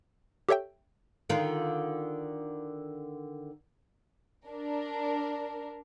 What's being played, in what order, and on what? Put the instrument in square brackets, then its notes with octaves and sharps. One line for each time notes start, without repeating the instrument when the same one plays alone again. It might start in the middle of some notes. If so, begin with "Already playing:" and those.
[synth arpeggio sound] G4 A4 C#5 E5 G5
[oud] D3 D#3 F4
[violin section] D4 A#4